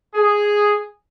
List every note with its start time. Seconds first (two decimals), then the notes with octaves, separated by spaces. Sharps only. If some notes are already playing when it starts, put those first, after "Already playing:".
0.15 G#4